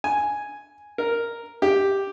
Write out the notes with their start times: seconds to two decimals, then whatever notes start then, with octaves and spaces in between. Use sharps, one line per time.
0.04 G#5
0.98 A#4
1.62 G4